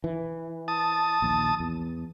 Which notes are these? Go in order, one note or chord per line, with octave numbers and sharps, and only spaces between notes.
E3
A5 D#6
A#1 D#2
E2